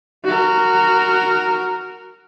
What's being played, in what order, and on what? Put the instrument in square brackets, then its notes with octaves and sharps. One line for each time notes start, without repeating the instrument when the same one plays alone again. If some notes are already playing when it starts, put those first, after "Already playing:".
[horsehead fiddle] F#4 A#4